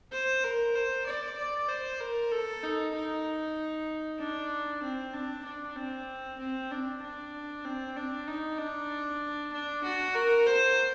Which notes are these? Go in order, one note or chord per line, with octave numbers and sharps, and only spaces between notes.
C5
A#4
C5
D5
D5
C5
A#4
A4
D#4
D#4
D4
C4
D4
D4
C4
C4
D4
D4
C4
D4
D#4
D4
D4
F#4
A#4
C5